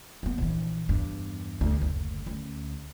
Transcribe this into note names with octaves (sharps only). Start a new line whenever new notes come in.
A#3 B3
A#1 E3
E2 G2
D2
F#1 D2
D2 C#4